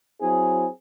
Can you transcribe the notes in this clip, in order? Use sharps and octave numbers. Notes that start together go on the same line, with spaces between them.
F#3 C4 E4 G#4